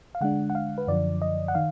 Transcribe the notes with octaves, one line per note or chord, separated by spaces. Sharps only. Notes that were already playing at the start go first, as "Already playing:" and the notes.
F5
D3 G#3 D4 F#5
F#5
F5
B4
F#2 D3 F3 D5
D#5
F#5
D#3 F5